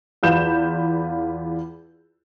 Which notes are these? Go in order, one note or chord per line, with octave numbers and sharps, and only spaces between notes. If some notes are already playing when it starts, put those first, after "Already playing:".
E2 F4 B4 G6 E7